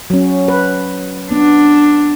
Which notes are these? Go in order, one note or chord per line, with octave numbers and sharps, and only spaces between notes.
F#3 C#4
B4
B3 D4